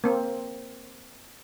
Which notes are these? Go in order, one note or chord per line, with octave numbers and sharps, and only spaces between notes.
A#3 C4